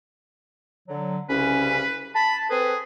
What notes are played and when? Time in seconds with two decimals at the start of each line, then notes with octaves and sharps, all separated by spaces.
0.88 D3 F#3
1.30 C2 C#3 C#4 B4
2.15 A5 B5
2.50 C4 G#4 A4 B4